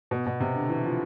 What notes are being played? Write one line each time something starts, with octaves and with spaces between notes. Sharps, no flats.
B2
B2
C3
D3
E3
F3